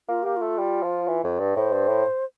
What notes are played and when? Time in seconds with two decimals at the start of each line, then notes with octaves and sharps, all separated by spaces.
0.09 A#3 F4
0.23 A#3 G4
0.37 A3 F4
0.58 G3
0.83 F3
1.08 E3
1.24 F2
1.39 G2
1.56 A2 C5
1.72 G2
1.88 A2